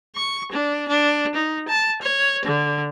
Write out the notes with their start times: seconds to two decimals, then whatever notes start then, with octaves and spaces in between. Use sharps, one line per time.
0.16 C#6
0.52 D4
0.88 D4
1.35 D#4
1.68 A5
2.02 C#5
2.45 D3